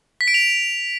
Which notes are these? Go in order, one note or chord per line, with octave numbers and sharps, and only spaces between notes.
B6
D7
F7